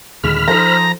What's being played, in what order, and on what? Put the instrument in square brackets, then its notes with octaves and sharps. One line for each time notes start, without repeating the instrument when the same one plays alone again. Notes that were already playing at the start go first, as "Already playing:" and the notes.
[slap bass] D#2 A#2 D3 [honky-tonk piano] G#3 E7 [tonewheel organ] B5 F6
[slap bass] F3 [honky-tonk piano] D#4 A4 C5 [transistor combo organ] A#5